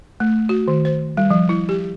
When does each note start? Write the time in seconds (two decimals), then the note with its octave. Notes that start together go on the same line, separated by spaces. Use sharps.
0.20 A3
0.49 F#4
0.68 D#3
0.85 C5
1.17 G3
1.30 F3
1.49 E4
1.69 G4